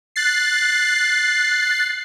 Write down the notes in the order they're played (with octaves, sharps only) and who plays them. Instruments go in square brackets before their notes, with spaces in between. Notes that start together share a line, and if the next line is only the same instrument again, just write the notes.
[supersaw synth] F#6 A6 C7